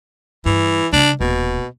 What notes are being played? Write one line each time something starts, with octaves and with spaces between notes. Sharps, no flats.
G2 E3
C#3 G3 D4
D#1 B2